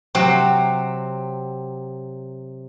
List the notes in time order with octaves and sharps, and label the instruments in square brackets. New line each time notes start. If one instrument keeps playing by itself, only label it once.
[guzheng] C3 F#3 C4